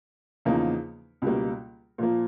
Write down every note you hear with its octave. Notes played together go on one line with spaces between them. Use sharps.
E2 C#3 F3 A#3 D#4
C#2 B2 G3 A#3
A#2 F3 A#3